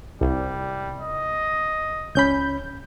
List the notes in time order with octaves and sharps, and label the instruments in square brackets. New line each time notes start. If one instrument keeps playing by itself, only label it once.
[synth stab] C2 [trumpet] G3
[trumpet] D#5
[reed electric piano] C#2 C#4 B5 [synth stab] G6